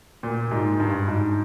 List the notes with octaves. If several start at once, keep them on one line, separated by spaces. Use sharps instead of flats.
A#2
G#2
G2
G#2